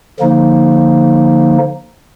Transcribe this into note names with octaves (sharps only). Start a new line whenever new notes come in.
D3 F3 A#3 D#4